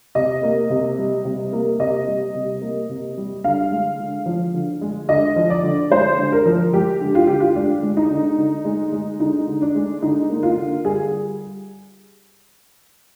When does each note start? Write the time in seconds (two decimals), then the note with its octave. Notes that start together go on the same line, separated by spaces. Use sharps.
0.15 C3 D#5
0.43 A#3
0.70 C3
0.98 G3
1.25 C3
1.52 A#3
1.79 C3 D#5
2.07 G3
2.35 C3
2.61 A#3
2.89 C3
3.17 G3
3.44 D3 F5
3.72 G#3
3.99 D3
4.26 F3
4.54 D3
4.81 G#3
5.09 D3 D#5
5.36 F3
5.50 D5
5.63 D3
5.90 G#3 C5
6.18 D3
6.32 A#4
6.45 F3
6.73 G#3 G4
7.01 D3
7.15 F4
7.27 D3 G4
7.40 F4
7.55 G#3 D4
7.83 G#3
7.97 D#4
8.11 D3
8.38 D3
8.64 G#3
8.92 G#3
9.20 D3 D#4
9.47 D3
9.62 D4
9.75 G#3
10.02 D3 D#4
10.29 A#3
10.43 F4
10.57 D3
10.84 G3 G#4